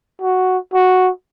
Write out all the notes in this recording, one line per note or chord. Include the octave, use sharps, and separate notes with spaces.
F#4
F#4